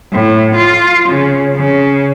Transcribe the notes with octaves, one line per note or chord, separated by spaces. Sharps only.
A2
F4
C#3
C#3